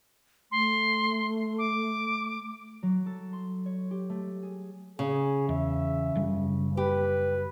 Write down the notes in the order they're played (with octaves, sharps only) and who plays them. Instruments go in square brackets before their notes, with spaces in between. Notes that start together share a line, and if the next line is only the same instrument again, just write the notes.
[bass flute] A3 [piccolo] C6
[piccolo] D6
[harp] F#3
A4
C6
C#5
G4
A3
G#4
[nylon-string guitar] C#3 [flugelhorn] G#4
[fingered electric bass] E2 [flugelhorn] E5
[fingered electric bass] F#1 G3
[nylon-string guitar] G4 [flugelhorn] B4